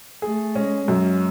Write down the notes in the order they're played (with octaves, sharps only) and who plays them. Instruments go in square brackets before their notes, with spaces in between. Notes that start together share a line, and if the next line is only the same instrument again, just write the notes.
[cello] A3 [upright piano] G#4
[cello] G#3 [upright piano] C#4
[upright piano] F#2 [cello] G#3